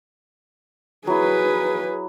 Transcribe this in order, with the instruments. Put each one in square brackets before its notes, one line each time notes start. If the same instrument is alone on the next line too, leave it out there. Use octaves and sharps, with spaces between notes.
[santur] F#3 E4 [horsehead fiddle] G#4 B4